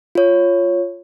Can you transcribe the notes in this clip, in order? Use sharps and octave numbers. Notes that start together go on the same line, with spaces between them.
F4 C#5